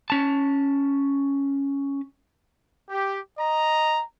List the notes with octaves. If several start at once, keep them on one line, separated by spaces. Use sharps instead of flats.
C#4 A5
G4
D#5 A#5